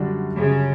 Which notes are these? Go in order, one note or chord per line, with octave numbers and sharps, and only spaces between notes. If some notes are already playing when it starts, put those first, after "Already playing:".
Already playing: F#2 D3 G3 D4 F#4
F#2 C#3